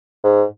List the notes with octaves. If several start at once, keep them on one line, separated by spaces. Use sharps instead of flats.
G#2